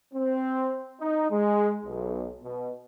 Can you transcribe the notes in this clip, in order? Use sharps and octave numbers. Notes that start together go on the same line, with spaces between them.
C4
D#4
G#3
B1
B2